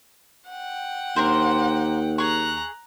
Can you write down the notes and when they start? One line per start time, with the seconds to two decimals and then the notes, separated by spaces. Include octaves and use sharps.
0.49 F#5 G5
1.16 D#2 D4 A#4 C5
2.18 G#4 A#5 C#6 F#6